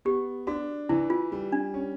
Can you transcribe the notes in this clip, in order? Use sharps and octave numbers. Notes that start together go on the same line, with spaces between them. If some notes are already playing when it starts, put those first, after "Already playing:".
B3 G4
D4 F#4
E3 E4
F4
G3
D4
C#4